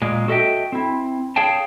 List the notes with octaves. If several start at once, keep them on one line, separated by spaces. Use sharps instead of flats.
A#2 G#3
F#4 A4 D#5 E5 G5
C4 E4
G#4 C#5 F5 G5 A5